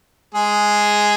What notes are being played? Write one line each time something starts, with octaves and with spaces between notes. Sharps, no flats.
G#3 G#4